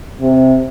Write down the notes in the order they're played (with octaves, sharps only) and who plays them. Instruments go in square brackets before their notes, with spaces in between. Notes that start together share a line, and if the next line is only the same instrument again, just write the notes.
[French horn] C3